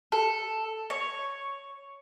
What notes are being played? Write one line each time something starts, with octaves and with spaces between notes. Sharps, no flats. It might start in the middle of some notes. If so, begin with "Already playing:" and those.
A4
C#5